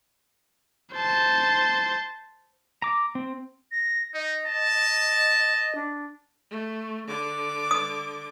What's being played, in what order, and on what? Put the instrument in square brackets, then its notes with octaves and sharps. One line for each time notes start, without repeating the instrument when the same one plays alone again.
[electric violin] C5 A5
[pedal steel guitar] A#5 D6
C4
[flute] A#6
[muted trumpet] D#4 [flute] D#5
[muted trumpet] A5
[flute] D4
[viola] A3
D3 D6
[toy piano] D#6